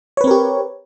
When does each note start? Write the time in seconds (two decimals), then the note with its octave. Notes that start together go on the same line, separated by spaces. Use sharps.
0.17 C#5
0.21 B4
0.24 C4
0.27 A#4
0.31 G4